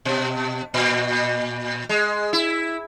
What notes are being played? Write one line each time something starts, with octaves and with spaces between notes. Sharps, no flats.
B2
A#2
G#3
E4